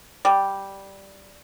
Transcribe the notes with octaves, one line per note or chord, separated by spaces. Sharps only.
G3